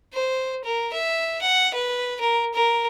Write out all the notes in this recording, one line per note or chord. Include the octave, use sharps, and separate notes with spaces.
C5
A#4
E5
F#5
B4
A#4
A#4